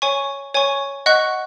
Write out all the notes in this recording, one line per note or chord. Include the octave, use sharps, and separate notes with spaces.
C#5 G#5 C#6
C#5 G#5 C#6
D#5 F#5 C#6 F#6